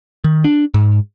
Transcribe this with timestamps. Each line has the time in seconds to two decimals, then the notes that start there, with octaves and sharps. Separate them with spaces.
0.24 D#3
0.44 D4
0.74 G#2